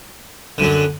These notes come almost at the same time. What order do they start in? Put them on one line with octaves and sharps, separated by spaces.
D3 F#2 F#3